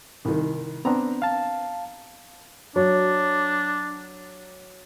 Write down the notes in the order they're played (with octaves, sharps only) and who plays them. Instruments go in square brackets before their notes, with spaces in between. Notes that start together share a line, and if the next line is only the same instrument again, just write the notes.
[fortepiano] C2 D#3
[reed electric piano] B3 C4 D4 [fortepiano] A#5
[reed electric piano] F5 A5
[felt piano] F#3 C#5 [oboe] D4